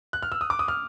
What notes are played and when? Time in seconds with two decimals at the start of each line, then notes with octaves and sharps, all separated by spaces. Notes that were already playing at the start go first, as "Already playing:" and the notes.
0.13 F#6
0.23 F6
0.32 E6
0.41 D#6
0.50 D6
0.59 D#6
0.68 F6